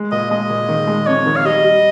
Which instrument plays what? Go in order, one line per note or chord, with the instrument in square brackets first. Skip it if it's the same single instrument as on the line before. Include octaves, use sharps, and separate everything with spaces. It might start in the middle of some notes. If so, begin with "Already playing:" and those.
Already playing: [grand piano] G#3
[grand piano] A#2 [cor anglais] D#5
[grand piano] G#3 [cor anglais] D#5
[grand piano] A#2
D#3
G#3
[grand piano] F2 [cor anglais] C#5
[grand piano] D#3
[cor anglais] F5
[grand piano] G3 [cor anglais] D#5
[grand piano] G3